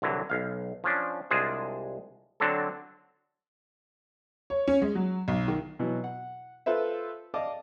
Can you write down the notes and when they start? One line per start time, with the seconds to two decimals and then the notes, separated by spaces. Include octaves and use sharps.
0.02 C2 D3 E3 F#3
0.30 B1 F5
0.84 F3 C#4 D4
1.31 C2 G#3 D4 F4 G#4 C5
2.40 D3 F#3 C4 D4 A4
4.50 C#5
4.68 C#4
4.82 G#3
4.95 F#3
5.28 B1
5.48 D#3
5.79 B2 E3 F#3
6.04 F#5
6.66 F4 A4 B4 C5 E5
7.34 D5 D#5 F5 A5 D6